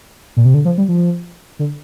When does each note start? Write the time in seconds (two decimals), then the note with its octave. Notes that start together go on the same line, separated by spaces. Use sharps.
0.37 A#2
0.45 C3
0.54 D3
0.65 F3
0.78 G3
0.89 F3
1.59 D3